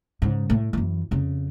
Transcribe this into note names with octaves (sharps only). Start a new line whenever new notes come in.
G#2 C#3
A2
F#2 E3
F2 C#3